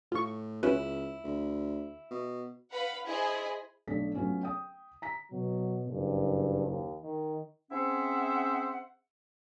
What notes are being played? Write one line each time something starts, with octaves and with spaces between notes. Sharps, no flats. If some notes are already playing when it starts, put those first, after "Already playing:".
A2 F4 C#6
C#2 C#4 E4 F#4 B4
D2
B2
B4 F5 F#5 B5
E4 G#4 C5 D#5 G#5 B5
B1 A3 D4 B6
F#3 A3 B3 C#4 F4
G5 D#6
A#5 B6
B2 F#3
F#1 G2
D#2
D#3
C4 C#4 G#4 C5 E5 F#5